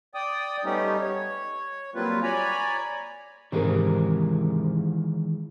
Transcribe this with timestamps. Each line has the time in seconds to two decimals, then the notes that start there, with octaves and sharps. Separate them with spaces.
0.14 D5 G5 D#6
0.64 G3 A3 B3 C#4 D#4 G4
1.00 C#5
1.95 F#3 G3 A#3 C4 F4 B4
2.23 C#5 D5 G#5 A#5 B5
3.52 G#2 C3 D#3 E3 G#3 A#4